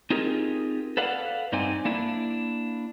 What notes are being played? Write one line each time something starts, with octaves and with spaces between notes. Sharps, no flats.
C4 D#4 F4 G4 G#4 A#4
A4 B4 D5 F5 F#5
G2 C4 D#4 C5 D5 G#5
A#3 D4 E4